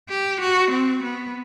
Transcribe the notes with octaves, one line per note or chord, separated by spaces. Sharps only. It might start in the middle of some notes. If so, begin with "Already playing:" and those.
G4
F#4
C4
B3